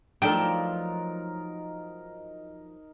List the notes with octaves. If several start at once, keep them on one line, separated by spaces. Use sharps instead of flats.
F3 F#3 A3 D4 D#4 A4 A#4 G5